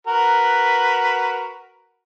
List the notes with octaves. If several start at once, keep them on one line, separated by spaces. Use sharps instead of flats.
F#4 A#4 B4